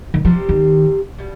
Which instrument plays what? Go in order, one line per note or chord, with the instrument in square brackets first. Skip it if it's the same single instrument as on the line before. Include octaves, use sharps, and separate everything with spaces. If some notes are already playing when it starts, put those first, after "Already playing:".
[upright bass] D#3
[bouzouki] C3 G3 C4 G4 [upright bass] F3
[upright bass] D#3
[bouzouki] B2 G3